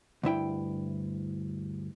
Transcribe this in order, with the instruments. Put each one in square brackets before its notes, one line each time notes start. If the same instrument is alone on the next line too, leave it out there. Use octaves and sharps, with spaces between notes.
[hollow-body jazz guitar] D2 G2 E4 G5